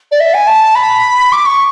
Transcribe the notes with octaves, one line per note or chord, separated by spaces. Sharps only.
D5
E5
G#5
A5
B5
D6
C#6